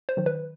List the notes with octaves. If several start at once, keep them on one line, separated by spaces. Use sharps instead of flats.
C5
D#3 F#3
B4